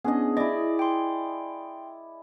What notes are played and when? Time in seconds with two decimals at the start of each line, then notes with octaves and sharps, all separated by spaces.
0.04 B3 C#4 D4 G#4 D#5
0.37 E4 D5 D#5
0.79 G5 C6